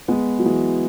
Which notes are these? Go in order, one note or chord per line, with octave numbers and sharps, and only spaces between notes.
G#3 B3
F#3
E3 G#3